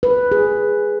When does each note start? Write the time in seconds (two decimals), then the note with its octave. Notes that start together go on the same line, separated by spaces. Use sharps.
0.03 B4
0.32 G#4